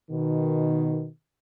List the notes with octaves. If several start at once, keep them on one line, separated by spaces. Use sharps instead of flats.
B2 D#3